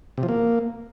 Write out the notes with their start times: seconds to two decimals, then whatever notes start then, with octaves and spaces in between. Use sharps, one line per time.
0.18 C3
0.23 F3
0.29 A#3